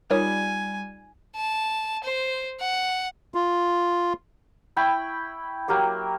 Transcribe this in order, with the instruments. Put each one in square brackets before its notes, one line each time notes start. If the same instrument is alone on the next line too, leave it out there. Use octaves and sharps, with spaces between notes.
[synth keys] G3 [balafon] D#4 F4 [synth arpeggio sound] A#4 C#5 D#6 [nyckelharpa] G#5
[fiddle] A5
C5
F#5
[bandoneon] F4
[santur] E4 G5 B5 C#6
F#3 A#3 G4 D6